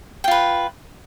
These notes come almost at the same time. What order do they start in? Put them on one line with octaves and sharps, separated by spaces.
G5 F4 B4